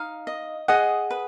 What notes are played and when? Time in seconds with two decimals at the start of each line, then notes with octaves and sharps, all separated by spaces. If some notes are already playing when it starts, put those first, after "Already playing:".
Already playing: D#4 F5
0.27 D#5
0.68 G#4 D#5 F#5
1.11 B4